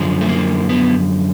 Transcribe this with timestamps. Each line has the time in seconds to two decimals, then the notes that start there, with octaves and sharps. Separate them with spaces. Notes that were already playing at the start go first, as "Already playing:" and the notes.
Already playing: F#2 D3 F3
0.21 A3
0.29 A#3
0.69 B3